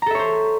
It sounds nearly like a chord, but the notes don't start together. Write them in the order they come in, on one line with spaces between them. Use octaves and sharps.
A#5 A4 E5 C#5 C5